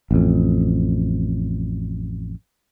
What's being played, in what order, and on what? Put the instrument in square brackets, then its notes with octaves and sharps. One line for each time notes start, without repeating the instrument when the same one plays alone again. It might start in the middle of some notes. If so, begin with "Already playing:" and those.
[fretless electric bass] A1 F2